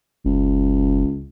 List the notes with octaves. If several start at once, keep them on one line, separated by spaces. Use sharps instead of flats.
F#1 C#2